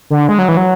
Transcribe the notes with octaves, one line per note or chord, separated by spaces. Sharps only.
D3
G#3
F#3
E3
F#3